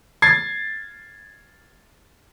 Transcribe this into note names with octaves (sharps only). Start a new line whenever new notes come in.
G#6 A6 C7